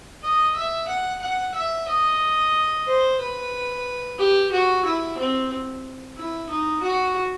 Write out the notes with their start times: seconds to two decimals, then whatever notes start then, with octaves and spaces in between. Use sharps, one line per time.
0.23 D#5
0.56 E5
0.88 F#5
1.22 F#5
1.54 E5
1.88 D#5
2.87 C5
3.20 B4
4.18 G4
4.51 F#4
4.85 E4
5.18 C4
6.17 E4
6.49 D#4
6.82 F#4